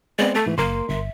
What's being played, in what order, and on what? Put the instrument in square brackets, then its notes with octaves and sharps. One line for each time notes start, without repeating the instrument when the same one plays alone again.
[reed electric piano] G#3 B3 C4 [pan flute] D5
[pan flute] A3 [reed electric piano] A4 A6
[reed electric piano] G#2 E3
[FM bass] F#1 [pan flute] A#3 [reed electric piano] A#4 C6
[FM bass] G1 [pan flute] E5